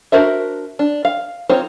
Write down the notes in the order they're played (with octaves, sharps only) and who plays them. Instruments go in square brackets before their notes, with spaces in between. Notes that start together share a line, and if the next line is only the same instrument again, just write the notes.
[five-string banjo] D4 F#4 A#4 C5 E5
D4
F5
C4 D#4 F4 C5 C#5